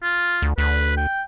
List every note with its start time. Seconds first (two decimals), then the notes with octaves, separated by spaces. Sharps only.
0.03 F4
0.42 D2
0.58 D2 B4
0.97 G5